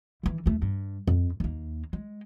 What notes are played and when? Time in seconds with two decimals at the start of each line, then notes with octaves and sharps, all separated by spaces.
0.23 D#3 E3
0.46 D#2 A3
0.62 G2
1.07 F2
1.40 D#2 A#3
1.93 G#3